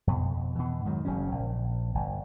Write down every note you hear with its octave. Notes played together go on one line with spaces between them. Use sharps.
F2 B2
B2 E3
G#2 D#3 F#3
F#1 C#3 F#3 C#4
A#1
G1